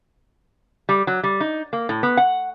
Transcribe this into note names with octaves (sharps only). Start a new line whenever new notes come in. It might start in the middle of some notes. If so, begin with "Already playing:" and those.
G3
F#3
G3
D#4
A#3
A2
B3
F#5